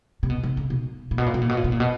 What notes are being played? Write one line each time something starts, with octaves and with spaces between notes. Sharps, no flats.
C3
B2
C3
C#3
B2
A#2
B2
A#2
B2
A#2
B2
A#2
B2
A#2
B2